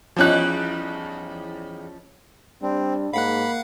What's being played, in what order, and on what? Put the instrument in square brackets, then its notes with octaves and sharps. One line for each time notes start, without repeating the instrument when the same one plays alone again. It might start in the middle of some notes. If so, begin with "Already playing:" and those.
[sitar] E2 G3 D#4 [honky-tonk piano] F3 C#4 F#6
[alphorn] G3 [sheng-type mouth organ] C4 [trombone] D4
[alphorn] G#2 [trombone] A#3 [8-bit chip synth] F5 F#5 F#6 [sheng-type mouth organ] B5